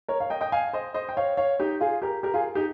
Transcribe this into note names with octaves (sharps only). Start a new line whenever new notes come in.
A#4 C#5
C#5 F5
D#5 G5
D#5 G5
F5 G#5
C5 D#5
C5 D#5
G5
C#5 F5
C#5 F5
D#4 G4
F4 G#4
G4 A#4
G4 A#4
F4 G#4
D#4 G4